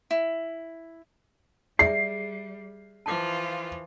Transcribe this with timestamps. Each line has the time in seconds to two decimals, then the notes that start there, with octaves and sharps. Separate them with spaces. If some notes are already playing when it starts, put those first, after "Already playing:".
0.11 E4
1.79 G3 G#4 D5 E5 C7
3.06 E3 F3 F4 A5 D6